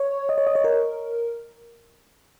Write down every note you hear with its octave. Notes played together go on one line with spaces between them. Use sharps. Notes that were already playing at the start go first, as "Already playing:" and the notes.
Already playing: C#5
D#5
C#5
D#5
C#5
A#4